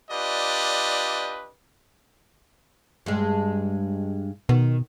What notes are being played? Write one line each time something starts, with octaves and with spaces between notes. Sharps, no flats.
D4 F4 G4 B4 D5 D#5
G2 G#3
B2 D#3